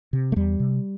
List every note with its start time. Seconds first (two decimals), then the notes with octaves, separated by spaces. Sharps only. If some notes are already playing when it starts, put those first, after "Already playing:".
0.13 C3
0.32 A3
0.36 E2 G3
0.60 C3